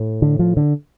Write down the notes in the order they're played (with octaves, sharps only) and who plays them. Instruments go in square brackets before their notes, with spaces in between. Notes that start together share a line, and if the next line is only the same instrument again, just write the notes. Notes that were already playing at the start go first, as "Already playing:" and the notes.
Already playing: [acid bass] A2
[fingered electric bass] D3
F3
D3